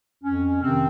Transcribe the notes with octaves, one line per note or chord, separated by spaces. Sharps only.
F2 C#4
C3 D#3 C4